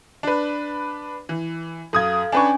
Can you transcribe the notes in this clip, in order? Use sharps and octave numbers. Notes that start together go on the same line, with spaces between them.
D4 B4
E3
F#2 A4 F5 D#6 G#6
C#4 D4 B4 G#5 C#6